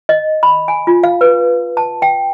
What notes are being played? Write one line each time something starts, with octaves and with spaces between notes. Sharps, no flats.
D#5
B5
G#5
F4
F5
B4
A5
G5